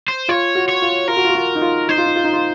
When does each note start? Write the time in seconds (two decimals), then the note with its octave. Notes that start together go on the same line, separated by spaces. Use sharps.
0.08 C5
0.28 F4 C#5
0.55 F#4
0.68 C#5
0.82 F4
1.08 F4 A#4
1.17 F#4
1.24 F4
1.30 F#4
1.35 F4
1.55 D#4
1.62 F4
1.89 D#4 C5
1.98 F4
2.06 D#4
2.16 F4
2.24 D#4
2.33 F4